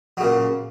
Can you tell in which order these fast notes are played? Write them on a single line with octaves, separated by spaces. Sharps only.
F#3 C#3 A#2